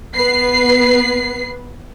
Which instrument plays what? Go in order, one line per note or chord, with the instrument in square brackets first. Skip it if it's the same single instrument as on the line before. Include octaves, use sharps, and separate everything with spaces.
[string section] B3 B4 C7